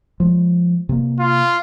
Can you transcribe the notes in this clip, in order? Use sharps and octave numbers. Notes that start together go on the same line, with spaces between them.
F3 G#3
C3 A#3
F4